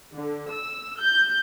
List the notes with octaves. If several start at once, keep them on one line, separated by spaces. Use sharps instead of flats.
D3
E6
G6